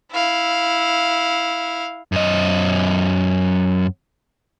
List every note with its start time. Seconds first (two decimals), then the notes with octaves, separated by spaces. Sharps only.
0.13 E4 F5
2.12 F#2 D#5